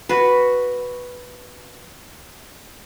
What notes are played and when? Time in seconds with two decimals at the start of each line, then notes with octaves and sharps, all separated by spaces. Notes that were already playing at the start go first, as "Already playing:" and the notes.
0.09 F#4 B4